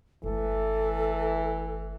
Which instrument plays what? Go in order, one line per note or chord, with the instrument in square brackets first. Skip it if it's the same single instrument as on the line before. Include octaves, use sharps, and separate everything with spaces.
[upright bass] G1 A3 [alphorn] E3 [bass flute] A4